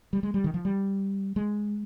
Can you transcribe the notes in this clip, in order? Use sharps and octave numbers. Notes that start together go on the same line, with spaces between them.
G3
G#3
G3
D#3
F3
G3
G#3